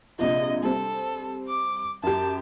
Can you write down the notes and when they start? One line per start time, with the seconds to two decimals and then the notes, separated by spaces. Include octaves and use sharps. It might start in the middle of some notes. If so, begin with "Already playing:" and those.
0.19 A#1 C3 F3 D#5
0.63 G3 C4 A4
1.48 D6
2.03 F#2 G4 A5